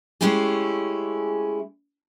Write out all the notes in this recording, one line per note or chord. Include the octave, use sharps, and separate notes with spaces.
G#3 A3 C#4 E4 G4 G#4